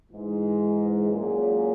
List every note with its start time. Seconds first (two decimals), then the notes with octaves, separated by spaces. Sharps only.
0.10 G#2 E3 G#3 D#4
1.08 A#2 F#3 C#4 G#4